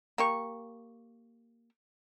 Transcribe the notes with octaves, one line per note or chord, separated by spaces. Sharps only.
A#3 G4 C#6